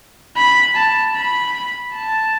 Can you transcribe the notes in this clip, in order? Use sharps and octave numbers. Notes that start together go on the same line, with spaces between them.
B5
A5
B5
A5